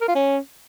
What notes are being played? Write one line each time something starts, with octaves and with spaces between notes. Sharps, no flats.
A#4
F4
C#4